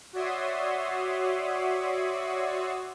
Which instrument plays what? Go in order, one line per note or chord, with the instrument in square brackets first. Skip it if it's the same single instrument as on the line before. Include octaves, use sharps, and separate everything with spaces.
[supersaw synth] F#4 C#5 D5 E5 C6 D#6